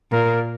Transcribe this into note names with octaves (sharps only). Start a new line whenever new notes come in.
A#2 A#4